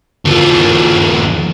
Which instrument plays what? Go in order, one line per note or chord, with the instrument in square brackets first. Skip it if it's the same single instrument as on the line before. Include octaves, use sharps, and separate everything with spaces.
[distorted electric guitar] D#2 F3